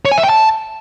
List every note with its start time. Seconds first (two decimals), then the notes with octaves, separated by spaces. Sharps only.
0.05 C#5
0.11 G#5
0.17 E5
0.23 G5
0.29 A5